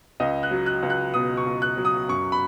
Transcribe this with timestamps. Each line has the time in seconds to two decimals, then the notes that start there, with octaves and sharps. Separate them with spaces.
0.20 C#2 D#5
0.43 F#6
0.51 F#3
0.66 F#6
0.83 C#2
0.90 F#6
1.14 B2 D#6
1.37 C#6
1.46 C#2
1.62 F#6
1.77 F#3
1.85 D#6
2.09 F#2 C#6
2.32 B5